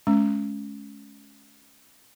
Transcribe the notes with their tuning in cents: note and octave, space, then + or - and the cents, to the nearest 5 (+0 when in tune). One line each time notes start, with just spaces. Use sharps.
G#3 +35 C#4 +15